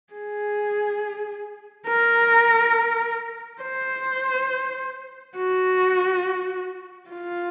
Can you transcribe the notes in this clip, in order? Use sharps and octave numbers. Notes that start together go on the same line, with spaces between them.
G#4
A#4
C5
F#4
F4